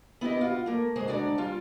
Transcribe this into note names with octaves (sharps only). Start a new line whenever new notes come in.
B3 E4 G4 D#5
F4 F#4
A3 A#3
D2 G#3 G#4 C5
D2 G#3 D4 F#4 D5 A#5
G3 F4